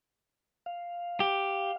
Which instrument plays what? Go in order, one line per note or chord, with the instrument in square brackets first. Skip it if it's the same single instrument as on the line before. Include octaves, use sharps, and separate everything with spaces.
[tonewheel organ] F5
[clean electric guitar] G4